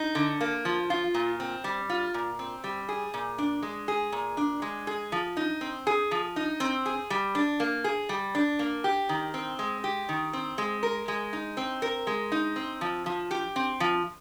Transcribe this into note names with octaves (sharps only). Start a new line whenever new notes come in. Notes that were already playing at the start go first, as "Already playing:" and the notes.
Already playing: D#4
D3
A#3
F3
F4
A#2
C4
G3
F4
A#2
C4
G3
G#4
A#2
D4
G#3
G#4
A#2
D4
G#3
G#4
F3
D#4
C4
G#4
F3
D#4
C4
G#4
G3
D4
A#3
G#4
G3
D4
A#3
G4
D#3
C4
G#3
G4
D#3
C4
G#3
A#4
G#3
D#4
C4
A#4
G#3
D#4
C4
F3
F3
G4
C4
F3